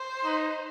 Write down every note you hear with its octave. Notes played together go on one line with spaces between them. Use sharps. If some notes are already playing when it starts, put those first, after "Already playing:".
Already playing: C5
D#4